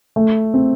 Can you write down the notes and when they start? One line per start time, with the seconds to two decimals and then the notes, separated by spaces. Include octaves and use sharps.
0.16 A3
0.54 C4